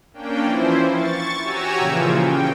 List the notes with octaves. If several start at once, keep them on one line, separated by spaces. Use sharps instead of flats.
A#3 C#4 D4 G5
E3 F3 E4 C5
C#6 A6
F#4 G4 C#5 G#5 A#5 E6
A#2 C#3 E3 F3
G5